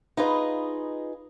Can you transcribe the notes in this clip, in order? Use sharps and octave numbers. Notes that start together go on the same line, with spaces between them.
D#4 F4 G#4 B4 D#5